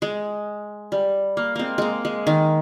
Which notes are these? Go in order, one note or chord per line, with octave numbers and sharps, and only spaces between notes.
G#3
G3
A#3
G#3 A#3 C4
G#3 A#3
G#3
D#3